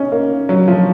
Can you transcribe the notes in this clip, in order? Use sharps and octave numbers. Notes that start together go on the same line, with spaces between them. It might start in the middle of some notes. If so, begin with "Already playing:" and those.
Already playing: C#4 D#4
A#3
F#3
F3